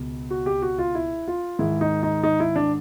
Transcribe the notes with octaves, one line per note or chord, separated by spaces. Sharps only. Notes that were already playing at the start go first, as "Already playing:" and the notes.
Already playing: C#2 B2
F#4
G4
F#4
F4
E4
F4
G#2 D#3 G#3 E4
D#4
D#4
D#4
E4
D4